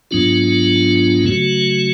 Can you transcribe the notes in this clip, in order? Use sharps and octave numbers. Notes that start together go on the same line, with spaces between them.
G#2 F#3 B3 D4 F4
C#3 F#3 A3 C#4 F#4